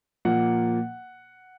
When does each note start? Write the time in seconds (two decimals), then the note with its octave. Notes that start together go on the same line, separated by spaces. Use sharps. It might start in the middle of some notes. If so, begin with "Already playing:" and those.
0.25 A#2 F3 A#3 F#5